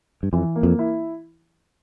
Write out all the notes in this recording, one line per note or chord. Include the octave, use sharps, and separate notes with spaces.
G2
F2 E3
A#3
F2
E4